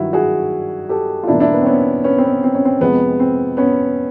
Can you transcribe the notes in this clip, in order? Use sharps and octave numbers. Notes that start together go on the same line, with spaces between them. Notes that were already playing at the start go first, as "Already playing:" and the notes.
Already playing: G2 D#3 F#3 E4 F#4
F#4 G#4
G4 A4
F4
E2 B2 G3 A#3 D4 E4
D4 E4
B3
C4
B3 C#4
B3 C#4
C4
B3
C4
C#4
C4
F2 C3 F3 G#3 B3
C4
B3 C#4